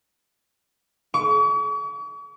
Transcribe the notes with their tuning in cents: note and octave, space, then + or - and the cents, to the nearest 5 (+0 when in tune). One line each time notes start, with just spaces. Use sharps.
C#6 +45